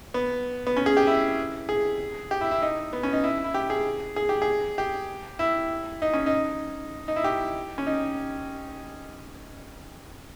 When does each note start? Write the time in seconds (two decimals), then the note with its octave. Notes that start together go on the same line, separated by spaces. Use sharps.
0.14 B3
0.67 B3
0.77 C#4
0.86 G#4
0.97 G4
1.07 E4
1.69 G#4
2.31 G4
2.41 E4
2.51 E4
2.62 D#4
2.93 B3
3.03 C#4
3.13 D#4
3.24 E4
3.44 E4
3.54 G4
3.70 G#4
4.16 G#4
4.29 G4
4.42 G#4
4.78 G4
5.39 E4
6.02 D#4
6.13 C#4
6.26 D#4
7.08 D#4
7.16 E4
7.24 G4
7.78 C#4
7.86 D#4